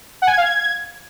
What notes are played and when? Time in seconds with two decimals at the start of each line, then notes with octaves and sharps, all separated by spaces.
0.22 F#5
0.27 G#5
0.32 G#6
0.38 F5
0.43 G#6